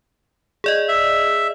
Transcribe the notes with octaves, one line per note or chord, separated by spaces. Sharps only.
G#4 D5 D#5
E5